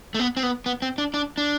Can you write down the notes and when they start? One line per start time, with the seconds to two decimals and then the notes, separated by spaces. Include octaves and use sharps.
0.14 A3
0.19 B3
0.37 C4
0.43 B3
0.66 B3
0.82 C4
0.98 D4
1.14 D4
1.38 D4